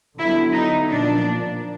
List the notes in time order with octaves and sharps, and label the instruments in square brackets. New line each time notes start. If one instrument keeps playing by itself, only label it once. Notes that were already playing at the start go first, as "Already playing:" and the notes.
[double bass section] D3 F#3 B3 [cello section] E4
[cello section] D#4
[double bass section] A#2 F3 A#3 [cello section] D4